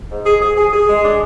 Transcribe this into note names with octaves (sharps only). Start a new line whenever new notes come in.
G#2
G#4
G#4
G#4
G#4
G#3
D4